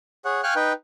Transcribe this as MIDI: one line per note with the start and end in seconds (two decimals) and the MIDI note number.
0.25 0.41 68
0.25 0.41 73
0.25 0.41 78
0.43 0.54 77
0.43 0.54 79
0.43 0.54 80
0.43 0.54 85
0.43 0.54 89
0.43 0.54 90
0.56 0.73 63
0.56 0.73 71
0.56 0.73 79